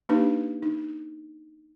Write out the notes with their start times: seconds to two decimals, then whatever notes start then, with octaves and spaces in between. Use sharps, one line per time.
0.09 A#3 D4 D#4 G4 B4
0.63 D#4